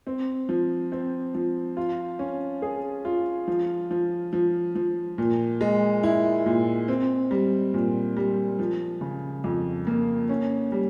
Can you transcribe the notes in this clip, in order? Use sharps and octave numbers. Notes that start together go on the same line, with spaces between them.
C4
F3
C4
F3
F4
C#4
G#4
F4
F3
F3
F3
F3
A#2
G#3
E4
A#2
C4
G3
A#2
G3
F3
C#3
F2
A#3
C#4
G3